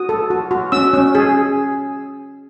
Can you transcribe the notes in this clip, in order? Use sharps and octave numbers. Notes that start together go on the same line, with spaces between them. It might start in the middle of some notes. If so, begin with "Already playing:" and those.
Already playing: F#4 D#6
A4
F#4
F#4
C#4 E6
C#4
G#4